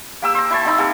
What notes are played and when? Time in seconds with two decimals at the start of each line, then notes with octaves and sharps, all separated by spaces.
0.22 A#3 G4 E6
0.35 C5 A#5
0.50 E4 C5 A5
0.65 C4 D#4 E4 A#5
0.78 A#3 C4 G4 A4